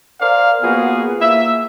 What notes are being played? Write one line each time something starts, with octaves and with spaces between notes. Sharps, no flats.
A#4 C5 D5 F5
A#3 B3 F4 F#4 G#4
A#3 E5